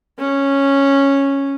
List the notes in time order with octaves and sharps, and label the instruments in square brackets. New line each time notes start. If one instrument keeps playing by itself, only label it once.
[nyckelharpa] C#4